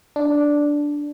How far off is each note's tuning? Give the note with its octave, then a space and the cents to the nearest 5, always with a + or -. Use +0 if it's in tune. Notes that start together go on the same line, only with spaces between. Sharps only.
D4 -5